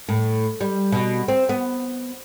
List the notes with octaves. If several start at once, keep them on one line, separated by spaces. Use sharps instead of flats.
A2
G3
B2
C4
B3